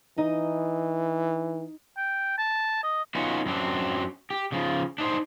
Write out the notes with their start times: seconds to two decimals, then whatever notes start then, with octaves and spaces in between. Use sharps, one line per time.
0.18 E3 D#4 D#5
1.97 G5
2.38 A5
2.83 D#5
3.15 B3 C#4 D#4 F4 F#4
3.46 F#2 F#3 C4 D4
4.30 G4
4.52 C#3 F3
4.98 D4 D#4 C5